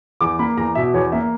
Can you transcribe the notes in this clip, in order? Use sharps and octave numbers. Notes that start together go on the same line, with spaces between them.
E2 D6
A#3 B5
E2 A#5
B2 E5
E2 C#5
A#3 E5